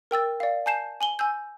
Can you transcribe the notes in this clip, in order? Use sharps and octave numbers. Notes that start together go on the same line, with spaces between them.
A#4 G5 E6 A6
D5 F5
G#5 A5 G6 C7 E7
G#5 F#7 G7
G#5 E6 G6